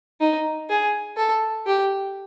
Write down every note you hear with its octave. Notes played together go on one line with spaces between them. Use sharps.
D#4
G#4
A4
G4